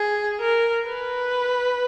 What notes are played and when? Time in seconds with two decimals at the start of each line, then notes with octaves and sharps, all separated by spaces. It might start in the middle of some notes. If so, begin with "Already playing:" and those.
Already playing: G#4
0.40 A#4
0.86 B4